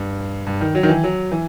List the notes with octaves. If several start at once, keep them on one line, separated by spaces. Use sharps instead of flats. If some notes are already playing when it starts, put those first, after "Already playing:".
Already playing: G2
G2
D#3
F#3
D#3
E3
F#3
E3